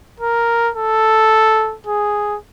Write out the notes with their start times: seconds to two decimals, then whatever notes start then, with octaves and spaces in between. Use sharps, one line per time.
0.20 A#4
0.75 A4
1.87 G#4